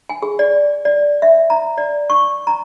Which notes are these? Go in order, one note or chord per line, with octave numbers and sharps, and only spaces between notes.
G#5
G#4
D5
D5
E5
A#5
D5
C#6
A#5